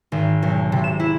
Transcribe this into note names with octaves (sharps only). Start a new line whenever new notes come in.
G#1
B1
C3
E7
E4